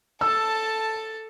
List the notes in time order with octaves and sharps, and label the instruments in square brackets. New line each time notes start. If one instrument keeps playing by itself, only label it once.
[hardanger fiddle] A4 A5 [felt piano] E6